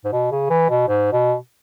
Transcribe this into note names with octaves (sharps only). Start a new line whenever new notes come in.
G#2
B2
C#3
E3
B2
G#2
B2